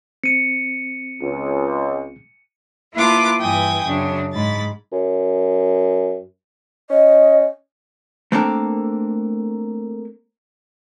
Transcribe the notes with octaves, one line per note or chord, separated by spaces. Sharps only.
C4 C#7 D#7
C#2
A#3 E4 F4 B4 A5 D6
G2 E3 G5 G#5 D#6
F#2 C#3 D4
G#2 B5 A6
F#2
C#4 D#5
A3 A#3 C4 D4 A4 A#4